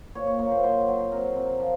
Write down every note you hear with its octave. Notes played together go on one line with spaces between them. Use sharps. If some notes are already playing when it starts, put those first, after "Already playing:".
A#2 C#5
C#5
A#3 C#5
A#4 C5
F#3 C5
F#3
C3 A#4
C3
F3